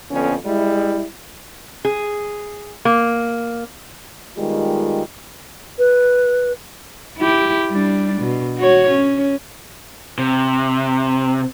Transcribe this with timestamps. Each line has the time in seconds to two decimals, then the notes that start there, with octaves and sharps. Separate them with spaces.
0.11 F2 D3 B3 C#4
0.45 G3 G#3 E4
1.85 G#4
2.85 A#3
4.37 D#3 G3 G#3 B3 F4
5.79 B4
7.18 E4 G4
7.71 G3 D4
8.22 B2
8.58 F#4 C#5
8.90 C#4
10.18 C3